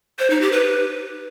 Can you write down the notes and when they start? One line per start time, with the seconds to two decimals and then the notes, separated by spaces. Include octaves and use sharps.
0.19 C5
0.30 D#4
0.41 G4
0.52 B4